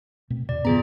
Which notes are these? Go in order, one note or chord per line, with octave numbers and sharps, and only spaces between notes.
B2 A3 C4
E2 B2 D5
G2 C#3 F3 B3 F4 G#4 A#5